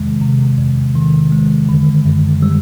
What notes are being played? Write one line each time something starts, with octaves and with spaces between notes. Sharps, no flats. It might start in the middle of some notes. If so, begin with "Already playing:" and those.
Already playing: E2 C3 D#3 G#3
C3
E2
D#3
G#3
D3
F#2
G3